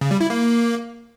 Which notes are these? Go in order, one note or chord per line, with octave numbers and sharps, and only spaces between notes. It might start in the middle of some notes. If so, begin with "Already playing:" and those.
C#3
G3
E4
A#3